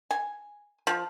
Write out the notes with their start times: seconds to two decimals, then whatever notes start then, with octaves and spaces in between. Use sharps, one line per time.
0.11 G#5
0.87 F3